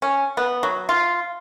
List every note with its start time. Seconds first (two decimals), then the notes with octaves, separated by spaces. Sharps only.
0.02 C#4
0.37 B3
0.63 F#3
0.89 F4